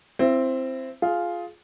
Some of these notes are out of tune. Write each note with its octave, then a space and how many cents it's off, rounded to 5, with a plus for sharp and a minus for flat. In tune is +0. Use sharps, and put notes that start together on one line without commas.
C4 +0 E4 +30
F4 +0 G#4 +20